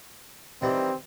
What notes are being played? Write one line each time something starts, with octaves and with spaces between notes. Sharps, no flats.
D#3 E3 G3 C4